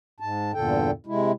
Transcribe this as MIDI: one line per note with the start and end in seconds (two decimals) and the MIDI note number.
0.20 0.51 44
0.20 0.51 81
0.54 0.91 40
0.54 0.91 43
0.54 0.91 46
0.54 0.91 50
0.54 0.91 69
0.54 0.91 79
1.06 1.32 48
1.06 1.32 56
1.06 1.32 64